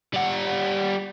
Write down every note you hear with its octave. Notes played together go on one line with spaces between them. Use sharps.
G3 F#5